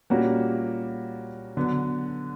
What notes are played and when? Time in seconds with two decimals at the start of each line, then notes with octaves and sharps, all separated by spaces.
0.10 A#2 G3 A#3 C#4 F#4
1.57 D3 F#3 B3